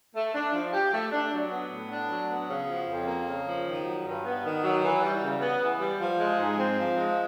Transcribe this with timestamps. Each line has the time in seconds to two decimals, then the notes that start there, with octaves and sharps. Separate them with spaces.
0.15 A3
0.34 D4
0.54 F3
0.73 G4
0.93 A3
1.12 D4
1.32 F#3
1.51 B3
1.71 A2
1.91 D4
2.09 F#3
2.30 B3
2.49 C#3
2.68 F3
2.88 F2
3.08 A#3
3.27 C#3
3.47 F3
3.66 D#3
3.86 F#3
4.05 G2
4.24 B3
4.44 D#3
4.63 F#3
4.83 E3
5.02 G3
5.22 C#3
5.41 B3
5.61 E3
5.80 G3
6.00 F3
6.20 G#3
6.39 G#2
6.59 C4
6.78 F3
6.97 G#3